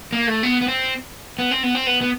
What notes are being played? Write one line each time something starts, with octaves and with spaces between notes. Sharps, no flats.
A#3
A3
B3
B3
C4
B3
C4
B3
C4
B3
B3